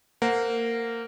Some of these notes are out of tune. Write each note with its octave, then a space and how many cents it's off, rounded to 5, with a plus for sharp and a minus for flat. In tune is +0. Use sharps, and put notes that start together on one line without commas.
A#3 -20 C5 -20 F#5 -25